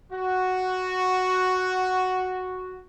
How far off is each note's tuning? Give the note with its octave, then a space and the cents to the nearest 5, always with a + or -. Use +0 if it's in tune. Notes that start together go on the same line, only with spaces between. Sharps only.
F#4 +0